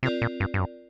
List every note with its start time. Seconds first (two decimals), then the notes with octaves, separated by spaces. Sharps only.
0.03 C3 C4 F4 A#4 D5
0.22 A#2
0.40 G2
0.54 G2
0.59 F#2